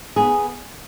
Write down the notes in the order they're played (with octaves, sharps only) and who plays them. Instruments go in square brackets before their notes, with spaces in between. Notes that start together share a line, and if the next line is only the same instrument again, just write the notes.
[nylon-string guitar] B3 G#4